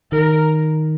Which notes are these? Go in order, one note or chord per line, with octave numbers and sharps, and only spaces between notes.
D#3 A#4